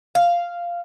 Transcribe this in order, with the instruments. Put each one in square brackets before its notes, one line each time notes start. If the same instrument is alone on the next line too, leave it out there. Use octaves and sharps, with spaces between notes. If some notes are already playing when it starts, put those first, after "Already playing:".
[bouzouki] F5